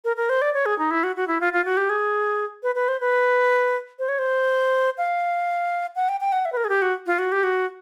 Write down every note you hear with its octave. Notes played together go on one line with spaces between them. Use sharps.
A#4
A#4
C5
D5
C#5
G#4
D#4
E4
F#4
F#4
E4
F4
F4
F#4
G4
G#4
B4
B4
C5
B4
C5
C#5
C5
F5
F#5
G5
G5
F#5
E5
B4
A#4
G#4
G4
F#4
F4
F#4
G4
F#4